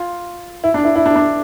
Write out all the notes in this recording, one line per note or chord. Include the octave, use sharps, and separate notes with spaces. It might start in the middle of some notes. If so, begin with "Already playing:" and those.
Already playing: F4
E4
D4
E4
E4
D4
D4